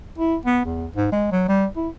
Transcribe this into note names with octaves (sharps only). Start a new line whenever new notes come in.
E4
B3
E2
G#2
G#3
F#3
G3
E4